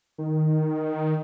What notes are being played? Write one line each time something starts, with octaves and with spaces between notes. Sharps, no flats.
D#3